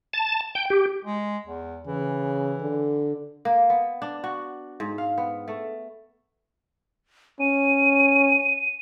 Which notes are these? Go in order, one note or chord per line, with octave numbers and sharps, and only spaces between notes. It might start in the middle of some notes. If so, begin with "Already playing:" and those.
A5
G5
G4
G#3
E2
C#3 E3
D3
A#3
B3
D4
F#4
G#2
F5
B3
A3
C#4 D#7